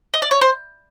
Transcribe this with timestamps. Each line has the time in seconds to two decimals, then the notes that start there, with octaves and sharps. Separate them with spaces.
0.14 D#5
0.22 D5
0.31 C#5
0.41 C5